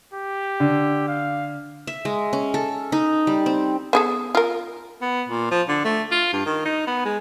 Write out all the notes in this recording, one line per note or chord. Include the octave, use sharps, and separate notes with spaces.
G4
D3
F5
E5
G#3
C#4
A4
D#4
G3
C4
B3 G#4 A4
F4 A#4
B3
A#2
F3
D3
A3
F4
G2
D#3
D#4
B3
G#3